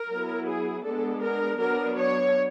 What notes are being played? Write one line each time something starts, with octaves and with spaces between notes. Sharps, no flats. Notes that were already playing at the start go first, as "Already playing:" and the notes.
Already playing: A#4
F#3 B3 E4
G#4
G#3 B3 D4 A4
A#4
F#3 B3 D4 A#4
C#5